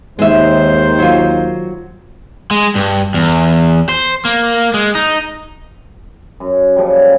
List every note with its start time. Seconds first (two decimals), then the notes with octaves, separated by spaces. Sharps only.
0.19 D#2 D#3 G#3 C5 E5
0.99 F#3 F4
2.51 G#3
2.76 G2
3.14 E2
3.89 C5
4.25 A#3
4.74 G#3
4.95 D#4
6.40 F#2
6.76 A#2 C#3 F3 G3